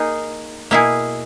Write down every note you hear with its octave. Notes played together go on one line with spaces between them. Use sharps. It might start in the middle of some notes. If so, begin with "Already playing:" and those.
Already playing: A#3 D#4 G#4
B2 A#3 E4 G#4